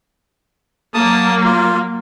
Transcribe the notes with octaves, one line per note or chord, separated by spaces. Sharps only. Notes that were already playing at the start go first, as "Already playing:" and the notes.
F#3 A#3 A5 D#6
F4